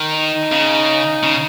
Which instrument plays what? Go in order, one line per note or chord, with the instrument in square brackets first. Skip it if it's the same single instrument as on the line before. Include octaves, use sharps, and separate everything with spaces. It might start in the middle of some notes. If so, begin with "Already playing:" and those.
Already playing: [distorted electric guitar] D#3
[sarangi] D#4
[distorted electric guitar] C#3
C#3